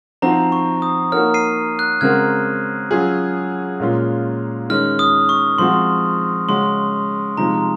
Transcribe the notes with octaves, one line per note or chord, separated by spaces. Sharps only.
F3 C4 D#4 F#4 C5 A#5
C#6
D#6
A#3 D#4 F#4 A#4 C#5 F6
C7 D#7
F#6
C#3 G#3 C4 F#4 A#4 F6 G#6
F#3 C#4 F4 G#4
A#2 G#3 C#4 F4
D#3 G#3 C#4 F6
D#6
C#6
F3 G#3 C4 F#4 C6
C#3 G#3 C#4 F#4 C6
C3 F3 G#3 D#4 A#5